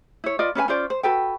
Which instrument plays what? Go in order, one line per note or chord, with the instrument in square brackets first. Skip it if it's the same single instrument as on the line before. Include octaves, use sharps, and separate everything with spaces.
[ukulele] E4 C#5
F4 B4 D5 D#5
C#4 B4 C5 G#5
C#4 F4 C5 D5
C5
F#4 A4 B4 G5